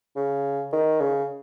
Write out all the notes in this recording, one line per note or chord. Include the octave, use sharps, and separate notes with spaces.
C#3
D#3
C#3